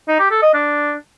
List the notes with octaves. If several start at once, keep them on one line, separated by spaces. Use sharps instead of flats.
D#4
G4
A4
D#5
D4